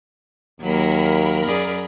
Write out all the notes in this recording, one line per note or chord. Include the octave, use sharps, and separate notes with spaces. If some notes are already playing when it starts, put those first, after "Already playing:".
D#2 F#3 A#3 A#4 B5
F#2 G#4 D5